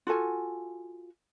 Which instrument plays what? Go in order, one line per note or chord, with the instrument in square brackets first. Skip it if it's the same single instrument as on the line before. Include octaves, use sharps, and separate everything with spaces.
[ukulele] F4 F#4 A4 G#5